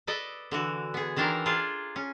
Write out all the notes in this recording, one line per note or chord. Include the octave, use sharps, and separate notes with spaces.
A4 B4 D5 D#5
D3 E3 F#4
B3 G#4
D#3 E3 D4 A4 A#4 C5
D4 F4 G#4
C#4